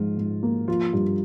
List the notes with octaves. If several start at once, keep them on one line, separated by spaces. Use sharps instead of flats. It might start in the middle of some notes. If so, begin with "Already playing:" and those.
Already playing: G#2 F3 F4
G#2
A#3
F3 F4
G2